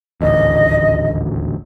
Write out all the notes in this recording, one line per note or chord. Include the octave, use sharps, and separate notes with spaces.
D#1 A1 D2 D#5